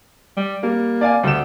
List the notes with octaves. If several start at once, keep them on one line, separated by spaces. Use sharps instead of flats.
G3
G3 A#3
D5 F5 G#5
D2 G3 E7